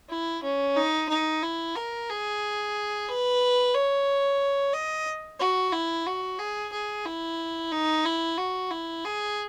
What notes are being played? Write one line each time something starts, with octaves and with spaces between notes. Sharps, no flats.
E4
C#4
D#4
D#4
E4
A#4
G#4
B4
C#5
D#5
F#4
E4
F#4
G#4
G#4
E4
D#4
E4
F#4
E4
G#4